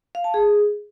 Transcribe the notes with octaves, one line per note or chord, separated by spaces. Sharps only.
F5
A5
G#4